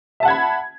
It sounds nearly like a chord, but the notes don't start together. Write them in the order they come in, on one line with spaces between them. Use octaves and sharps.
E5 A5 F#5 G#6 B5